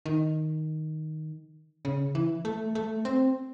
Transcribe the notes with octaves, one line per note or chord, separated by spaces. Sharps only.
D#3
C#3
E3
A3
A3
C4